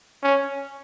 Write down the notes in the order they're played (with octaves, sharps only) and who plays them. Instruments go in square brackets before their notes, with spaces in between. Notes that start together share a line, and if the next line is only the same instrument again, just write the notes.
[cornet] C#4